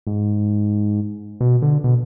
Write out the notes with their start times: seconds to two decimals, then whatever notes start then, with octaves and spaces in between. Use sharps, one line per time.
0.07 G#2
1.40 B2
1.62 D3
1.84 B2